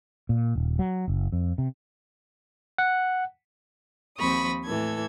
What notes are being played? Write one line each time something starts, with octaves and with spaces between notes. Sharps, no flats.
A#2
D#1
F#3
F#1
F2
C3
F#5
D#2 F3 C4 B5 C#6 D#6
A2 E3 A4 G#6